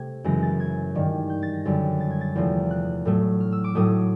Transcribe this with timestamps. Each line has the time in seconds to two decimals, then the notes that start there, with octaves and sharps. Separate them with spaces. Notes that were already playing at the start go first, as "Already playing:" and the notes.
Already playing: C3 A3 G#6
0.24 F#2 C#3 E3 G#3 A#6
0.42 A6
0.60 G#6
0.95 G2 D#3 G3
1.30 G6
1.42 A6
1.54 A#6
1.65 F#2 D3 G3 A6
2.00 A6
2.11 G#6
2.21 A6
2.35 E2 C3 F3 A3
2.71 F#6
3.05 A2 F#3 A3
3.40 F6
3.52 E6
3.64 D6
3.75 A2 F#3 A3 D#6